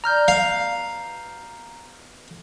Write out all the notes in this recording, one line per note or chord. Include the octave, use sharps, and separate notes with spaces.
D4 A#4 A#5 F6 G6
B2 B3 F5 A5